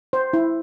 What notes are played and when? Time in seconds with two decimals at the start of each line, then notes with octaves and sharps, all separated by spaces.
0.13 C5
0.33 E4